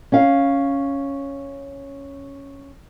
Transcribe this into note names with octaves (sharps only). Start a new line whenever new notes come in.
C#4 F5